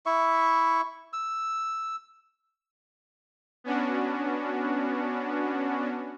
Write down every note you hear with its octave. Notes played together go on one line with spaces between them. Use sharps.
E4 E5 C#6
E6
B3 C#4 D4 F#4